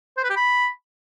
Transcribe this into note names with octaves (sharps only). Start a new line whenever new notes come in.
C5
B4
G4
B5